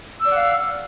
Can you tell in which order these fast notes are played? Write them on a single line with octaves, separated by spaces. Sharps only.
E6 D5 F#5 F5